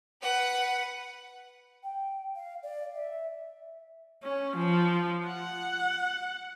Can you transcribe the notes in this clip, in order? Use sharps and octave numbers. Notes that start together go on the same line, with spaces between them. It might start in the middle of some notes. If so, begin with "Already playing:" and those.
B4 F#5
G5
F5
D5
E5
C#4
F3
F#5